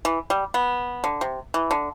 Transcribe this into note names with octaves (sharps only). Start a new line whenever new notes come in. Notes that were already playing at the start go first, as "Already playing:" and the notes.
E3
G3
B3
D3
C3
E3
D3